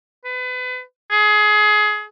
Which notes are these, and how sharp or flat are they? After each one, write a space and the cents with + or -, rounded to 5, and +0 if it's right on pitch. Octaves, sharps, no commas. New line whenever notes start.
B4 +30
G#4 +25